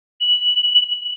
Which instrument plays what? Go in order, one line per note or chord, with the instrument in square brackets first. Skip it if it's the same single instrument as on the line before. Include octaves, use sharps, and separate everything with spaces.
[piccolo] F#7